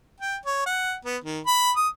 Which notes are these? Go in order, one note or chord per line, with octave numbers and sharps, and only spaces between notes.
G5
C#5
F#5
B3
D#3
B5
D#6